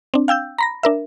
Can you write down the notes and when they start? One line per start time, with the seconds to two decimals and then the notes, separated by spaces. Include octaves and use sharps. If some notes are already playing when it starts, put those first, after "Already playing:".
0.14 C4 D4
0.28 F5 G5 E6 G6
0.58 A#5 B5 A#6
0.83 D4 A#4 E5